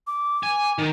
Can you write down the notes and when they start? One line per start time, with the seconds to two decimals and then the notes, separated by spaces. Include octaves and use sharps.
0.07 D6
0.43 G#5
0.78 D#3